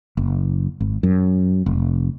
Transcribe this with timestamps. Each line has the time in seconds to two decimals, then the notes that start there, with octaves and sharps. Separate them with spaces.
0.17 F#1
0.80 G#1
1.03 F#2
1.66 F1